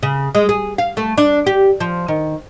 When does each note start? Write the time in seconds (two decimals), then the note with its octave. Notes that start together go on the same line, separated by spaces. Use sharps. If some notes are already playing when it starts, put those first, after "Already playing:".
0.03 C#3
0.35 G#3
0.49 G#4
0.78 F5
0.97 A3
1.18 D4
1.47 G4
1.80 F3
2.08 D#3